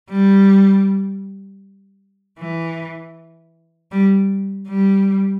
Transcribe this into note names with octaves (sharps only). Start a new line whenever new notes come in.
G3
E3
G3
G3